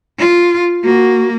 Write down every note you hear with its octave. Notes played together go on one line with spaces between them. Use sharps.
F4
A#3 F#4